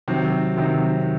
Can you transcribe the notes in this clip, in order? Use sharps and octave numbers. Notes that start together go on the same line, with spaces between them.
C3 D#3 F#3 C4
C3 D#3 F#3 C4